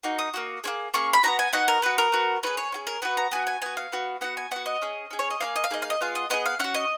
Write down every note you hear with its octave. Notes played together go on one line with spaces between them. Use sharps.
A#3 D#4 F#4
D#6
A#3 D#4 F#4
A#3 C#4 G#4
A#3 C#4 G#4 C#6
B5
B3 D#4 F#4 A#5
G#5
B3 D#4 F#4 F#5
A#4
B3 F#4 B4
A#4
B3 F#4
C#4 F4 G#4 B4
C#5
C#4 F4 G#4
A#4
B3 F#4 B4
A#5
B3 F#4 G#5
G#5
B3 F#4 G#5
F5
B3 F#4
B3 F#4 F#5
G#5
B3 F#4 F#5
D#5
C#4 G#4
C#4 G#4
C#5
D#5
A#3 D#4 G#4 F5
D#5
F5
A#3 D#4 G#4 D#5
F5
D#5
B3 F4 G#4 F5
D#5
B3 F4 G#4 D#5
F5
C#4 F#4 F#5
D#5